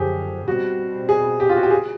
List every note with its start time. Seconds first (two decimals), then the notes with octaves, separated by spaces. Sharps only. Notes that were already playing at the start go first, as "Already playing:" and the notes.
Already playing: F#2 D3 F3 G4 G#4
0.48 B2 G3 C4 F#4
1.09 G#4
1.40 G4
1.49 F4
1.56 F#4
1.63 G4
1.70 G#4